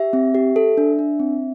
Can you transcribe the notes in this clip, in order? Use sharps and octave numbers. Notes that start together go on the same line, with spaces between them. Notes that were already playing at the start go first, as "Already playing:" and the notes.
Already playing: G4 E5
C4
G4
A4
D4
D4
C4